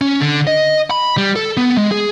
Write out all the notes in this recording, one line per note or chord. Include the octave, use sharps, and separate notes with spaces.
C#4
D3
D#5
B5
G3
A4
B3
G#3
G#4